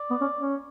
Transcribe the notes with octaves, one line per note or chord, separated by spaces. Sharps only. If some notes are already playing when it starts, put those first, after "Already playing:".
Already playing: D5
B3
C#4
C#4